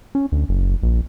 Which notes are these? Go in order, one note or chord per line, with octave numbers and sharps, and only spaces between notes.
C#4
D2
F#1
A#1